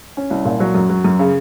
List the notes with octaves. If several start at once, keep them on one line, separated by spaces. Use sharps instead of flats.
C#4
C2
A#2
F#3
F#2
F#3
F#2
C#3